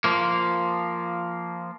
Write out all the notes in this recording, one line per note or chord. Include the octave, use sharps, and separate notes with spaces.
F3 A#3